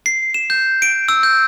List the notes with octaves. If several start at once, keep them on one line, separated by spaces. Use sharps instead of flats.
C7
E7
G6
D7
E6
G6